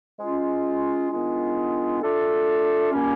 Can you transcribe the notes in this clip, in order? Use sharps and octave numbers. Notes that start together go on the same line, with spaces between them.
G#3 C#4 F4
D#3 G#3 B3 D4 F4
A3 D4 F4 A4
A#2 G3 A#3 C#4